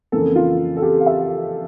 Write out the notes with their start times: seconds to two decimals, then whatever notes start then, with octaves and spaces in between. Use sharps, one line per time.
0.12 F2 C#3 E3 A#3 A4
0.36 F4
0.77 A4
0.82 G4
1.01 F5
1.06 E5